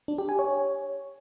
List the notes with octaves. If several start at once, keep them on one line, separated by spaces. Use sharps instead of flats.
D4
G4
G#5
C#5